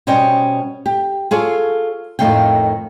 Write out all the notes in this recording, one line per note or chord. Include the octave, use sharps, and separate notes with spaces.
B2 G3 C#4 C5 D#5 G5
G4
F4 G#4 A4 C#5
F2 A2 D#3 A3 F5 G5